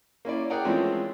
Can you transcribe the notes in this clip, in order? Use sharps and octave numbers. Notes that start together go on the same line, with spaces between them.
A#3 C#4 E4 D5
G#4 A#4 D5 F#5 G5 A#5
E3 F3 G#3 A3 C4 C#4